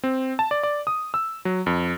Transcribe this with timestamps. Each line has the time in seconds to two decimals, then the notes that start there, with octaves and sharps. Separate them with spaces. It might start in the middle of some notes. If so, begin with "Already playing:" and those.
0.04 C4
0.39 A5
0.51 D5
0.63 D5
0.87 D#6
1.14 E6
1.45 F#3
1.66 F2